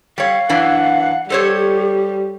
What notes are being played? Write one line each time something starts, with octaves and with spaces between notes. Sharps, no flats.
G3 C#5 F5
F#2 E3 D4 F#5
G3 G4 A4 C5 C#5